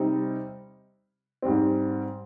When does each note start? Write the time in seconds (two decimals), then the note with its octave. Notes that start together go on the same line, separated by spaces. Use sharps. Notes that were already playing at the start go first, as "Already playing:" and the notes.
Already playing: C3 G3 C4 D#4
1.42 G#2 G3 C4